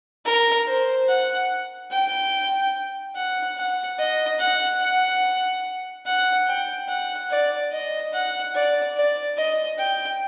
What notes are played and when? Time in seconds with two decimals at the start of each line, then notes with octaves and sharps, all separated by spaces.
0.25 A#4
0.66 C5
1.08 F#5
1.91 G5
3.15 F#5
3.57 F#5
3.98 D#5
4.39 F#5
4.81 F#5
6.05 F#5
6.47 G5
6.88 F#5
7.30 D5
7.71 D#5
8.13 F#5
8.54 D5
8.96 D5
9.37 D#5
9.78 G5